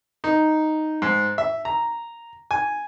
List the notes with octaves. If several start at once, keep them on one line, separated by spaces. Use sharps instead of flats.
D#4
G#2
E5
A#5
G#5